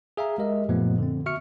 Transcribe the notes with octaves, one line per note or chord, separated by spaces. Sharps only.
G#4 E5 F5 A#5
G#3 G4 A#4 D#5 E5
F#2 A#2 F3 A3 B3
D3 C4
F#4 E5 C#6 F6 C#7